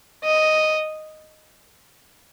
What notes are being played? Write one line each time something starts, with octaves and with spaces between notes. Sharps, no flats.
D#5